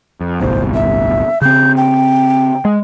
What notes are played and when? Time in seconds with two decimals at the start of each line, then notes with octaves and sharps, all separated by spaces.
0.21 F2
0.40 D1 G1 C2 C5
0.74 E5
1.42 C#3 C4 G6
1.77 G5
2.65 G#3